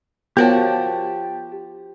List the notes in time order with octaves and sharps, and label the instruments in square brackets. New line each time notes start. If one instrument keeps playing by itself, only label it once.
[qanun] F3 F#4 [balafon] B3 A#4 C#5 [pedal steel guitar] G4 G5 A5